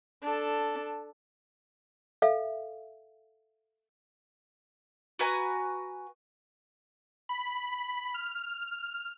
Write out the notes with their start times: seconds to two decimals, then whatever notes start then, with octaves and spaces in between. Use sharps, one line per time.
0.23 D4 A4
2.22 A4 E5 F5
5.19 F#4 B4 G#5 A#5
7.29 B5
8.14 F6